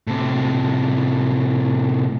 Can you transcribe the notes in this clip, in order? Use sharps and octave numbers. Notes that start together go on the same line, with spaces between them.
A2 C3